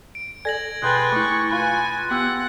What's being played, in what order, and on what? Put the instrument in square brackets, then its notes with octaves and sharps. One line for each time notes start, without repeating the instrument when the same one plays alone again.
[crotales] D7
[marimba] A4 D5 G#5 [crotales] G#6 A#6 F#7
[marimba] B2 [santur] G#3 G5 G#5 [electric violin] B4 C6 [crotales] F#6 A6
[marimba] A3 E4 [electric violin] C#6 [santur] D6
[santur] F4 B4 [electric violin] G#5
[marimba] B3 E6 G6 [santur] G4 [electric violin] F#5